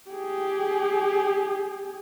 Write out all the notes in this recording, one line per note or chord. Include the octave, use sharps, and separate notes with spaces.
G4 G#4